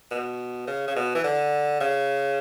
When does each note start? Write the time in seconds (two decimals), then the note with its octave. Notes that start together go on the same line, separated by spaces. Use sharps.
0.11 B2
0.67 C#3
0.87 C#3
0.96 B2
1.15 E3
1.24 D3
1.80 C#3